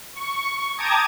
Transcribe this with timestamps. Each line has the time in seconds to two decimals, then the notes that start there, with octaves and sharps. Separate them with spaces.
0.12 C#6
0.76 G5 A5 A#5 D6 D#6 G#6